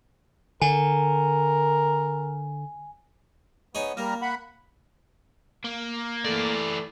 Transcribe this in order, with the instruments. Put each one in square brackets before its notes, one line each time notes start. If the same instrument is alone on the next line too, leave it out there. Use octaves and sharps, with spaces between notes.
[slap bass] D3 [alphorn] A#4 [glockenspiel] G#5
[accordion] B3 [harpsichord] D#4 G#4 C#5
[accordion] G3 A#5 F6 [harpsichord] A#3
[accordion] F#5 B5
[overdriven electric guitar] A#3
[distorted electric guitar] E3 D5 [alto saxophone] A3